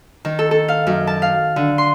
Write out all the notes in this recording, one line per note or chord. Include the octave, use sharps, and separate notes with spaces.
D#3
A4
A4
F5
F#2
A5
F5
D3
C6